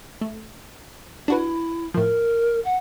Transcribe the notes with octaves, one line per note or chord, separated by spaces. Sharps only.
A3
D4 E4 F#4 B4
A2 F3 A#4
F#5